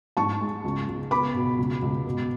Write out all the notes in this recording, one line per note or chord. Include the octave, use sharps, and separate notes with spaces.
G#2 A5 C#6
G#3
C#2
C#2
B3 B5 D6
B2
C#2
C#2
B2